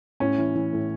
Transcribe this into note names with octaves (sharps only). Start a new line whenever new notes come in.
A2 C#4
E3
E3
A2